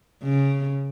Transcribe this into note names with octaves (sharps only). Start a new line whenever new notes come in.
C#3